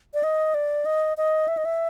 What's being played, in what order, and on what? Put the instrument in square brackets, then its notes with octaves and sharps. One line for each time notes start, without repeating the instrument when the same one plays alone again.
[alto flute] D5
D#5
D5
D#5
D#5
E5
D#5
E5